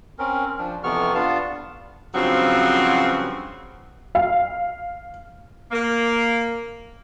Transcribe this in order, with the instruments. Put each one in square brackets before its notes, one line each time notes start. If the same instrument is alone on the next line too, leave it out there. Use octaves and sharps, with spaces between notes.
[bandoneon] C4 C#4 A#4
F3 D4
F2 C3 E3 B3 C#6 F6
B3 D4 F4 F5 A5
[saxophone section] G2 C#3 F3 F#3 C4 F#4
[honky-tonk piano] F5
[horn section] A#3